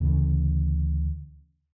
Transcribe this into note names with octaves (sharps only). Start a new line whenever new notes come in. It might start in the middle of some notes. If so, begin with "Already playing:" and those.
D2 C#3 E3